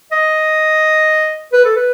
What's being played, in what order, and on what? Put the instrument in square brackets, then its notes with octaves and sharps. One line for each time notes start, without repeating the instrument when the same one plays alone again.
[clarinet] D#5
B4
A4
B4